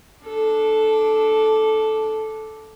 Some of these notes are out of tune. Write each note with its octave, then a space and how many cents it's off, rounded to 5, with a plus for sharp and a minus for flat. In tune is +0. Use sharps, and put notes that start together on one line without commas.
D4 +0 A4 -10